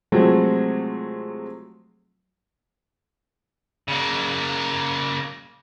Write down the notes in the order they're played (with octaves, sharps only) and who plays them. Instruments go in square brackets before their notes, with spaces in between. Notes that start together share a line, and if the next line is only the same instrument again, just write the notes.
[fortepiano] C3 F3 F#3 G#3 A3 C4
[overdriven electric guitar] C#3 A#3